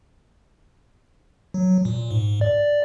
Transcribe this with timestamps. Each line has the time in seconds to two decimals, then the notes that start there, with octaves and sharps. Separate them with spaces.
1.54 F#3
1.85 A#2
2.11 G#2
2.41 D5